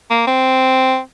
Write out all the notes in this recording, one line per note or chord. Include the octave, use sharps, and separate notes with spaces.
A#3
C4